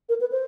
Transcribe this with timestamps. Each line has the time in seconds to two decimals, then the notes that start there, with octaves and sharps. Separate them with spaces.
0.09 A#4
0.20 B4
0.32 C5